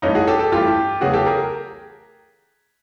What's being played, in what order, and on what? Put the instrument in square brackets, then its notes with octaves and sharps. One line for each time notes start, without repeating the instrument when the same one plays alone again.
[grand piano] G2 E3 A3 C#4 D#4
F#4 G#4
G4 A4
G4 A4
G2 E3 A3 F4 G4
E2 C#3 F#3 A3 F#4 G#4
G4 A4
G#4 A#4